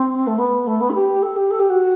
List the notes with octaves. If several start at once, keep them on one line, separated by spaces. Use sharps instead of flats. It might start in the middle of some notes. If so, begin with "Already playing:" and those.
Already playing: C4
A3
B3
A3
B3
A4
G4
A4
G4
A4
G4
F#4